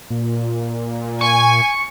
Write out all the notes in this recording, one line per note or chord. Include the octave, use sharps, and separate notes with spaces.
A#2
G#5 C#6